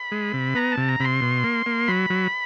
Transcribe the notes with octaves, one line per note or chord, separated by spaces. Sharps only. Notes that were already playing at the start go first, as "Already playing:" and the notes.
Already playing: B5
G#3
C3
B3 A#5
A5
C3
A#5
C3 B5 C6
B2
A#3
A#3
F#3 B5
F#3